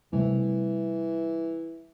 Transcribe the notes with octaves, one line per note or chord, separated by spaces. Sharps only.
C3 E3 G3 A3